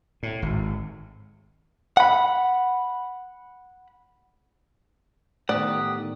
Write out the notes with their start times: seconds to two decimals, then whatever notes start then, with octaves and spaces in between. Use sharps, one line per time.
0.23 A2
0.42 G#1
1.97 F#5 B5
5.49 A2 D#3 A3 B3 G4 D5 F#5 D#6